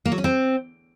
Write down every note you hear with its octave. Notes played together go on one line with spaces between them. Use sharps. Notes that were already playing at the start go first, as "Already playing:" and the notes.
A#3
F#3
C#4
C4